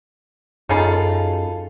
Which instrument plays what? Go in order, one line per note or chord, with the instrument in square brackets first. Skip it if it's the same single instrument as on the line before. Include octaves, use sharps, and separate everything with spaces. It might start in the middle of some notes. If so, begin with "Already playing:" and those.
[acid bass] F#2 [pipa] D#4 G#4 B5 [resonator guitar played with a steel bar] F4 A4